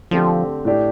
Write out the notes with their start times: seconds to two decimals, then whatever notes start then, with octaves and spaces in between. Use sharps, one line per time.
0.11 D3 F3 A3 C4 G4
0.65 A2 A3 D4 G4